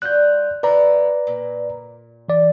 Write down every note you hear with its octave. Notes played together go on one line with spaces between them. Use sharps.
G3 F4 F#4 F#6 G6
D3 B3 E4 B4 D5 A#5
A#2
E3 D5